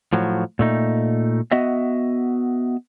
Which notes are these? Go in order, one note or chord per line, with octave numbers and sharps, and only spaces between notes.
A2 F3 F#3
A#2 A3 D#4
B3 F#4 D#5 E5